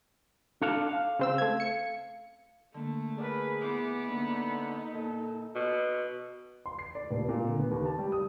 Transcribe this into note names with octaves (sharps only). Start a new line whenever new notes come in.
D4 A4 F5
F5
C#3 C4 E6
A3 G#6
C#7
D3 A3 A#3
G#4 A#4 B4 D5 F#5
B3 E4 C5 B5 D6
D3 A#3 D#4
A#2 A4
B2
C6
C7
D5
D#1
A#2
D3
B3
D#2
A5
G3
D#6